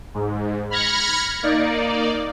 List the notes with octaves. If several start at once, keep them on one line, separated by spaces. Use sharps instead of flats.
G#2
B5 F6 G#6 A#6 C#7
A#3 D#4 D5